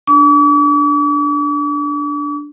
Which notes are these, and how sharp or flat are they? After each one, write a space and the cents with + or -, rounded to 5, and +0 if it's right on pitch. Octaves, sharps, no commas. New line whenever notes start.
D4 +0 D6 -45